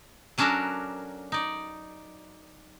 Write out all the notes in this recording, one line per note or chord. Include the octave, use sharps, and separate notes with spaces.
F#3 C#4 D4 F#4 A4 A#4
D#4 D5